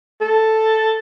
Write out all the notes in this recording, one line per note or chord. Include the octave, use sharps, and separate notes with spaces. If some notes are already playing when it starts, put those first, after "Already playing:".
A4